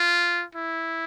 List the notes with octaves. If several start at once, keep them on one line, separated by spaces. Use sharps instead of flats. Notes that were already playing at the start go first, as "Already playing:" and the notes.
Already playing: F4
E4